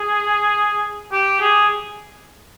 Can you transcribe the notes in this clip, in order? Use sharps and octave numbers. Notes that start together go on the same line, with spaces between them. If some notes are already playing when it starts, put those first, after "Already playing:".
Already playing: G#4
G4
G#4